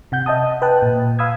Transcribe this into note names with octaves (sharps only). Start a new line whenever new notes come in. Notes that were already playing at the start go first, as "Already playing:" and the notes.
C3 F#5 G6
D#5 E5 A5 D#6
B4 G5 A5 F#6
A#2
F5 B5 D#6 E6 G#6